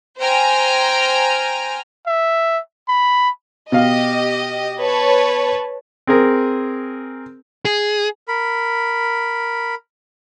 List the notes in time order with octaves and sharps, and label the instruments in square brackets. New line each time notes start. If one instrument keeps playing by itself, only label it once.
[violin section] C5 G5 G#5 A#5 F6
[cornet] E5
B5
[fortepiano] B2 F5 [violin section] G4 D#5
[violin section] B4 C#5 A5
[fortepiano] C4 G#4 A#4
[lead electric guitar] G#4
[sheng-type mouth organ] A#4 B5